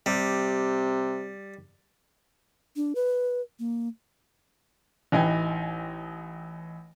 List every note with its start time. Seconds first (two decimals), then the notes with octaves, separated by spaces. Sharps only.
0.06 C3 G3
2.76 D4
2.95 B4
3.59 A#3
5.12 A1 E3 D#4 G5 G#5